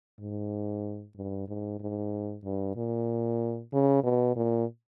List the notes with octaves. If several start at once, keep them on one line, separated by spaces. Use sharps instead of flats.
G#2
G2
G#2
G#2
G2
A#2
C#3
B2
A#2